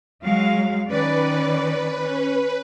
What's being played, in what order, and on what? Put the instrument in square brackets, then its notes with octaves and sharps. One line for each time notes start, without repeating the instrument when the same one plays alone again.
[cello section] F#3 G#3 F5
[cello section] D#3 C#4 D5 [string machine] B4
[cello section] C#4